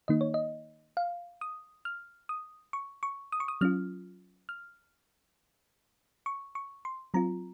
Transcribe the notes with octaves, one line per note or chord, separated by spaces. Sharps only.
D#3 A#3 D#4 D#5
C#5
D#5
F5
D#6
F6
D#6
C#6
C#6
D#6
C#6
D#6
F#3 C#4 F4 F6
F6
C#6
C#6
C6
F#3 C4 F4 A#5